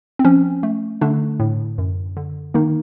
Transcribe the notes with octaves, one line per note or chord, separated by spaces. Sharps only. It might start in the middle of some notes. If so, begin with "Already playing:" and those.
C4
F3 C#4
A3
D3 A3 D4
A2
F#2
D3
D#3 A#3 D#4